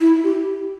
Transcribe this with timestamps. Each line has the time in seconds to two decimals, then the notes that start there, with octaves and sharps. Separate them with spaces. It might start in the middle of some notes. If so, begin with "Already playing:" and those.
0.01 E4
0.24 G4